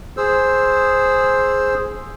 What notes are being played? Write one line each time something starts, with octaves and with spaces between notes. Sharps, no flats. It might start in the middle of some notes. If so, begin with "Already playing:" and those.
G#4 C5 E6